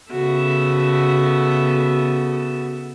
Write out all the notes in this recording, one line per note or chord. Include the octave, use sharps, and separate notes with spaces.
C#3 B3 F#4 A4 E5